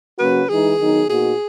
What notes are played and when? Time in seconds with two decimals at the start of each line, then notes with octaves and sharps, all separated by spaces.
0.19 C#3 F#3 A#3 C#4 F#4 B4
0.49 E3 G#3 D#4 G#4
0.79 D#3 F#3 B3 D#4
1.09 B2 A#3 D#4 F#4 G#4